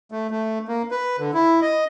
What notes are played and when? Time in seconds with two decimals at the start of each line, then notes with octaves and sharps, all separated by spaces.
0.12 A3
0.30 A3
0.68 A#3
0.91 B4
1.19 D3
1.34 E4
1.62 D#5